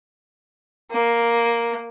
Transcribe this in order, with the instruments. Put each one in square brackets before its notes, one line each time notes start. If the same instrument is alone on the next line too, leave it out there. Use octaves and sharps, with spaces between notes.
[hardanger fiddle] A#3